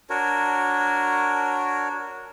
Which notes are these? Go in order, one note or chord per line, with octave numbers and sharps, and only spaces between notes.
D4 F#4 A#4 C#5